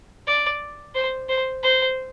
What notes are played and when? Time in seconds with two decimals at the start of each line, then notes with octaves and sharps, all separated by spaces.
0.27 D5
0.95 C5
1.29 C5
1.63 C5